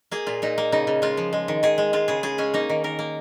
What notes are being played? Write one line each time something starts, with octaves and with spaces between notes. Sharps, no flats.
A#3 G#4
A#2 F4
A#2 D#4
A#3
C#3 D#4
C#3
G#3 F4
F3
G#3
D#3
D#3 G#4
G#3
G#3 F4
C#3 G#4
C#3 G#4
G#3 C#4
A#3 D#4
D#3
D#3 A#4
A#3